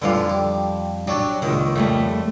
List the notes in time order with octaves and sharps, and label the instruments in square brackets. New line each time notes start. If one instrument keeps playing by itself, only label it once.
[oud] F2 G3 F5 [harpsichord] D3 E3 F3
[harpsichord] G4
[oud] F#3 D4 [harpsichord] G4 C#5 D5
[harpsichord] C#2 A#3 [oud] D#3
[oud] F2 G3 A3